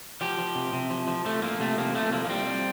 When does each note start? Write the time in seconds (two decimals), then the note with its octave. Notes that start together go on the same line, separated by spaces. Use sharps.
0.21 F3 G4
0.39 F3
0.55 C3
0.73 C3
0.90 F3
1.08 F3
1.25 F3 A3
1.42 F3 A#3
1.60 C3 A3
1.78 C3 A#3
1.95 F3 A3
2.12 F3 A#3
2.25 A#3
2.29 G3 C4
2.47 G3